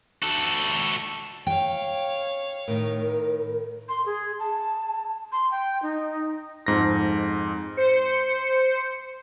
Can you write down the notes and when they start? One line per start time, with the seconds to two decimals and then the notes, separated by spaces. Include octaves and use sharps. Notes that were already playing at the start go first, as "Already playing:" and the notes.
0.22 F#4 A4
1.47 C#5 F5 G5
2.68 A2 D#3 A#4
3.89 C6
4.06 G#4
4.39 A5
5.32 C6
5.51 G5
5.82 D#4
6.66 F2 G#2 A#6
7.77 C5 C#7